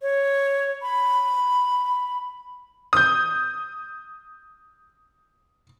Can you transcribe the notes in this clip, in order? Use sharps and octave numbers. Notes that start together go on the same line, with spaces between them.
C#5
B5
D#6 G6